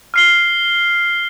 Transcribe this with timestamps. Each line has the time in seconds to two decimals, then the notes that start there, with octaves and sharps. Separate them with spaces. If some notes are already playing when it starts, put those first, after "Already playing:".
0.14 F6 C7 G7